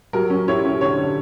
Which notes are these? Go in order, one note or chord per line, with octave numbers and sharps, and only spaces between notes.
F#3 A#4
C#4
E4 C#5
C#4
D3 C#5
D3